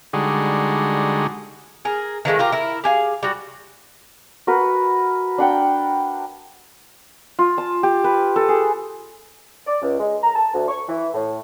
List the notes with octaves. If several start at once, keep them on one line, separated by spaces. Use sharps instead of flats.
D3 G3 G#3 D#4 F#4 G#4
G#4 A#4
D#3 F3 G#3 A3
F4 G4 A#4
E4 A#4
G4 G#4 F5
G3 F#4
F#4 A#4 B4
D4 F#5 G5
F4
A5
G4
B4
A4
G#4
D5
C#2
G#3
A#5
A5
D2
C#6
E3
A2